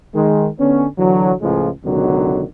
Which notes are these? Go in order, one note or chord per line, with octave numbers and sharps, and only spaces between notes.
D#3 G#3
D3 B3 C#4
D3 E3 F#3
C#2 A2 C#3 F3 G#3
C#2 B2 D3 D#3 F#3